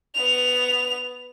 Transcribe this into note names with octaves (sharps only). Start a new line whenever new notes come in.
B3 F7